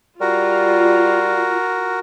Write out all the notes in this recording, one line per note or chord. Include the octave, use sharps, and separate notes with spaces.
G3 F4 F#4 A#4